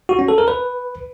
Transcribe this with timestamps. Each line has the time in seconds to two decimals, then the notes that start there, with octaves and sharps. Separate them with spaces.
0.09 F#4
0.19 C#4
0.28 A4
0.38 A#4
0.48 B4